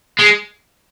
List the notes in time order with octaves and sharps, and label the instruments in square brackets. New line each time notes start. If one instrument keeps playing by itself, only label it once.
[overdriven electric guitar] G#3